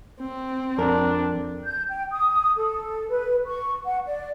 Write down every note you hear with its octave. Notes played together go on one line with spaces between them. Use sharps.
C4
F2 D4 A#4
G6
G5
D#6
A4
B4
C#6
F#5
D5